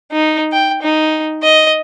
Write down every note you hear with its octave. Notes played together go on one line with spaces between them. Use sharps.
D#4
G5
D#4
D#5